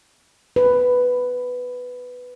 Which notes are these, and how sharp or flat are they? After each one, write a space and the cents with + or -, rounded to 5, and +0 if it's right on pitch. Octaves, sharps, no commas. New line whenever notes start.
B4 +5